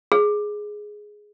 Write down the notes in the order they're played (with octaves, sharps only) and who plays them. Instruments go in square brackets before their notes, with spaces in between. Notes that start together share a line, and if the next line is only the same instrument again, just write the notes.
[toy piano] G#4